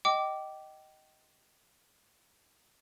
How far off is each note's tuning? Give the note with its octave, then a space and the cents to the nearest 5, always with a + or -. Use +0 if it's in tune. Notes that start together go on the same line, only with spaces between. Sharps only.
D#5 +0 G5 -25 D6 +0